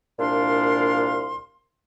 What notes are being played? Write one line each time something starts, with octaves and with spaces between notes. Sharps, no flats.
C2 A#2 D4 F5 C6